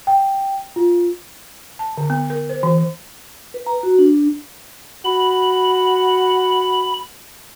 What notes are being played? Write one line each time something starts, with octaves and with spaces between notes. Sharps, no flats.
G5
F4
A5
D3
B3
A#4
C5
E3
B4
A#5
F#4
D4
F#4 B5